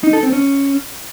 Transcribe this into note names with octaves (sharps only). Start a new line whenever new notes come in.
D#4
A4
C4
C#4